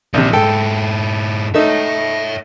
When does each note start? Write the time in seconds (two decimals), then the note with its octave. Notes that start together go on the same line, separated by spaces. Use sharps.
0.14 A#1 C3 D#3 E3
0.33 G#2 E4 A4 G5
1.54 A3 D#4 C#5 E5